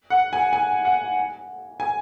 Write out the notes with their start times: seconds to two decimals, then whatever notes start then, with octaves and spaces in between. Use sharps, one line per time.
0.10 F#5
0.33 G#5
0.53 G#5
0.85 F#5
1.80 G#5